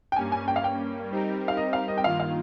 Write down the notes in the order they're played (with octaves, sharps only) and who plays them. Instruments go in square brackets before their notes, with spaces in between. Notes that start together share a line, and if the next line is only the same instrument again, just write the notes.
[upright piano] G5
[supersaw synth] G2 G3 A#3 C#4 [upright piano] G#5
[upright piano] G#5
G5
F5
G5
[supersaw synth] G3 C4 D#4 G4 A#4
[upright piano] F5
D#5
F5
D#5
G5
[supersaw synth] G2 D#3 A#3 F4 [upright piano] F5
[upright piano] F5